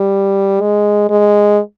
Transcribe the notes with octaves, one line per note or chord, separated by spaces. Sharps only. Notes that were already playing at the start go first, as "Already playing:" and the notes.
Already playing: G3
G#3
G#3